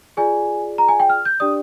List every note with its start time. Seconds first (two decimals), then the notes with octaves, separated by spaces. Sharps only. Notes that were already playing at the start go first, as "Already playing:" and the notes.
0.17 F4 G#4 D5 G#5
0.78 A#5
0.88 G#5
1.00 G5
1.09 F6
1.25 G6
1.40 D4 G4 D5 D#6